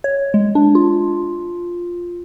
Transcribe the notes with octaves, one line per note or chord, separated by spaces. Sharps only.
C#5
G#3
D4
F4